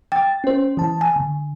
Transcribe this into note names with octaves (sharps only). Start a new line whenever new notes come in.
G5 A6
C#4 C5
E3 A5
G#5
D3